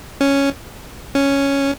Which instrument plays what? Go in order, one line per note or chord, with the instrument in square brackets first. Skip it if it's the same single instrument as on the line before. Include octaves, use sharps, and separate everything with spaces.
[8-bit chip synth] C#4
C#4